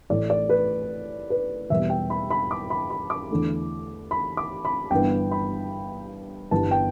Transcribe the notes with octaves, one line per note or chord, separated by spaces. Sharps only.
A1 A2 A3 D5
D5
B4
B4
E2 B2 G3 B3 E5
G5
B5
B5
D6
B5
B5
D6
E2 D3 A3
B5
D6
B5
G1 G2 E3 B3 G5
B5
G1 G2 E3 G3 B3 A5
G5